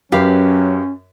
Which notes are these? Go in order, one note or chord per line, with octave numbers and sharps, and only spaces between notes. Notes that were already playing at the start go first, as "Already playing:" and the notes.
F#2 F#3 C#4 G4 B4 F5